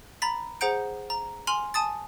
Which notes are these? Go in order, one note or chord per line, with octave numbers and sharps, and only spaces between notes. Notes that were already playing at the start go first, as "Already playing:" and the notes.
A#5 B5 A6 B6
G#4 C5 F#5 A#5 G6 D7
A#5
G#5 C6 F6 F7 F#7
G#5 A5 D#6 A6